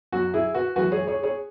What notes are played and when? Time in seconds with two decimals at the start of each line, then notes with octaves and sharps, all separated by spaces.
0.12 F#2 F#3 F#4
0.34 E4 G#4
0.55 F#4 B4
0.76 F#2 E3 G#3 F#4 B4
0.92 G#4 C#5
1.07 G#4 C#5
1.23 G#4 C#5